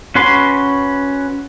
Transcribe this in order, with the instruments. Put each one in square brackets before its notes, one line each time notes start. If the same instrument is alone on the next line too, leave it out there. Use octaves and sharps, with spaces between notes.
[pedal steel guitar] C#4 F#4 B4 C6